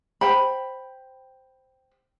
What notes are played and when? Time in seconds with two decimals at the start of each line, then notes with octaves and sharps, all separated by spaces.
0.21 C5 G5 B5